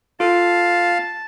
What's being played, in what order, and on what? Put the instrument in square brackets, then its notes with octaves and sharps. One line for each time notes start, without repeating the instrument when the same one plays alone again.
[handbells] F4 A4 [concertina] F5 [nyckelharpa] A5